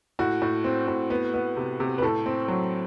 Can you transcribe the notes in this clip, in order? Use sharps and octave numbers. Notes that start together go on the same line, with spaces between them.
A2 F#4
A2
C4
A2
B3
B3
C3
C3
B4
A2 A4
C4
F#3